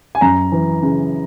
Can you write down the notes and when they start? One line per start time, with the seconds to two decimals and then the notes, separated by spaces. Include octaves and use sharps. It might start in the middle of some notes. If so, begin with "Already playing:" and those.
0.15 G#5
0.21 F#2 A#5
0.52 E3
0.82 C#3